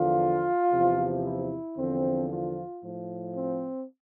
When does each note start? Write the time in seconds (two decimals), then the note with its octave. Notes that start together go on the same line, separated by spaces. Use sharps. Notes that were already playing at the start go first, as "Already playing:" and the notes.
Already playing: E2 D3 F3 F4
0.72 E2 C3 F3
1.25 E4
1.77 E2 D3 F3 C4
2.31 F4
2.83 A2 F3
3.36 C4